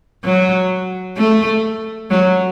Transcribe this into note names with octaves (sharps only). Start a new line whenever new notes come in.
F#3
A3
F#3